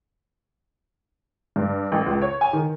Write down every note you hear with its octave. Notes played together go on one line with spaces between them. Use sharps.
G2
A1
C#2
C#5
G#5
D#3